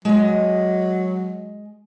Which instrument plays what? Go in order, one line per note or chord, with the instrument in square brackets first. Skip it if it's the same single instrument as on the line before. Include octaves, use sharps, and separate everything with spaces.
[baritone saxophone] F#3 [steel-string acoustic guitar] G#3 D#5